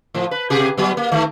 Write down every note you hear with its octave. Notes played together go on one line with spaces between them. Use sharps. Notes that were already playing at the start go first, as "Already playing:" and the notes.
A2 F3
B4
C3 G4 G#4
F#3 B3
A#3
D#3 A3